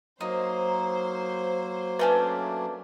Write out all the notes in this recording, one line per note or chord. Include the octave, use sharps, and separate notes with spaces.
F#3 A#3 D#4 C5
A3 C#4 D4 B4 G#5